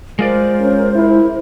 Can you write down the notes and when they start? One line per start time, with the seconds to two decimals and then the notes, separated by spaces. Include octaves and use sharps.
0.19 G#3 F4 A#4 C5 D5
0.60 C#4
0.95 E4